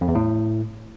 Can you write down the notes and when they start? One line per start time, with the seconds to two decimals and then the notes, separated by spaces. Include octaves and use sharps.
0.01 F2
0.08 E2
0.15 A2